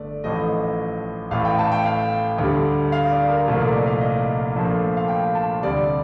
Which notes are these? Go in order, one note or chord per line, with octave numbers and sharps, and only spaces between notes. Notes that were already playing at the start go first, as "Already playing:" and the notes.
Already playing: G1 A3 D5
A1 A2 F3 A3 D#5
A1 A2 A3 F5
G5
A5
G5
F5
D2 D3 G3
F5
D5
A#4
C2 A#2 F3 A3 A#4
D5
D#5
F5
D#5
A#1 A#2 F3 A3
F5
G5
A5
D2 C3 G3 D5